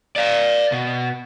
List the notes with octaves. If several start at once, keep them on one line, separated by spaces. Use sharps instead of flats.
D5 F5
B2